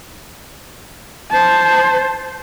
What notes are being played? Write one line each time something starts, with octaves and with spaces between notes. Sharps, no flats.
C5 A5